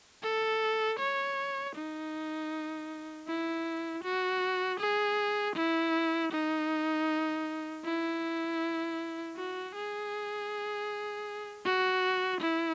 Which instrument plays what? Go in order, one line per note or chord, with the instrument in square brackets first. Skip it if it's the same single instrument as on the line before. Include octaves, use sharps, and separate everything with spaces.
[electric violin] A4
C#5
D#4
E4
F#4
G#4
E4
D#4
E4
F#4
G#4
F#4
E4